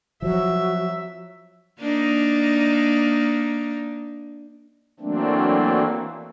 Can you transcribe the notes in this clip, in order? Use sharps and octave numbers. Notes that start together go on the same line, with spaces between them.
F3 F#3 F#4 E5
A#3 D4 D#4
E3 F#3 A3 A#3 C4 D4